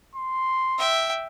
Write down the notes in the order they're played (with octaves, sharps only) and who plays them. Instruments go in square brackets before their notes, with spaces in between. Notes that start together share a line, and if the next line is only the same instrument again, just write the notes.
[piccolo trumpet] C6
[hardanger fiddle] E5 G5